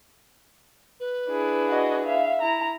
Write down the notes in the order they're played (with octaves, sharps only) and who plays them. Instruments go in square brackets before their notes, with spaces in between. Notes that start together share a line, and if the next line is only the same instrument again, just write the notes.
[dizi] B4
[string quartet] D4 E4 G#4
[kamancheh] F#4 D#5
E5 F5
[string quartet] E4 [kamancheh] A#5